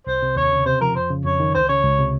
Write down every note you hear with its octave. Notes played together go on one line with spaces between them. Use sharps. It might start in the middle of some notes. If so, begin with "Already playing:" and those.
C2 C5
C3
D#2 C#5
C#3
C3 C5
F3 A#4
F2 C5
C#3
F2 C#5
D#3
C#2 C5
C#3 C#5
C#2
C3